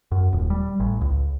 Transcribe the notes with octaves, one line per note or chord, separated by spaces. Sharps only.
F#2
D#1
G3
A1
C#2